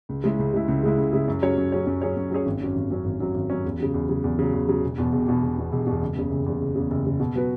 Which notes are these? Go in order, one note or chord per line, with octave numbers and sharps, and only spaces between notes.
C#2
C#3 G#3 E4
C#2
C#3 G#3 E4
C#2
C#3 G#3 E4
C#2
C#3 G#3 E4
F#2
F#3 C#4 G#4 C#5
F#2
F#3 C#4 G#4 C#5
F#2
F#3 C#4 G#4 C#5
F#2
F#3 C#4 G#4 C#5
G#1
F#2 F#3 C#4
G#1
F#2 F#3 C#4
G#1
F#2 F#3 C#4
G#1
F#2 F#3 C#4
E2
C#3 F#3
E2
C#3 F#3
E2
C#3 F#3
E2
C#3 F#3
E1
E2 B2
E1
E2 B2
E1
E2 B2
E1
E2 B2
F#1
E2 C#3
F#1
E2 C#3
F#1
E2 C#3
F#1
E2 C#3
B2
F#3 B3 F#4 B4